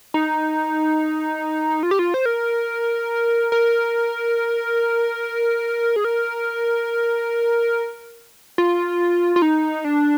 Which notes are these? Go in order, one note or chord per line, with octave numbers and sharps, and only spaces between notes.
D#4
F4
G4
F4
C5
A#4
A#4
G#4
A#4
F4
F4
D#4
D4